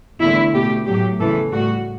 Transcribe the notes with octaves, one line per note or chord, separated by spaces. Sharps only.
E2 D3 A3 E4
B2 A3 G4
A2 F#3 A3 G4
E2 C#3 E3 A4
A2 G3 F#4